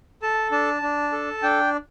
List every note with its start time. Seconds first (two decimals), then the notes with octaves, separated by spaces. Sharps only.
0.22 A4 A5
0.52 D4 A5
0.82 D4
1.12 A4
1.43 D4 G5